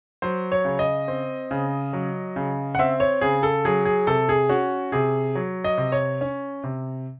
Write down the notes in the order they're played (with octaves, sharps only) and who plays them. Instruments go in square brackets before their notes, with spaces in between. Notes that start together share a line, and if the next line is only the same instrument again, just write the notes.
[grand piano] F#3 C5
C#5
C#3
D#5
C4
C#3
F#3
C#3
F#5
C4 E5
C#5
C#3 G#4
A4
F#3 G#4
G#4
C3 A4
G#4
C#4 F#4
C3 G#4
F#3
D#5
C3
C#5
C#4
C3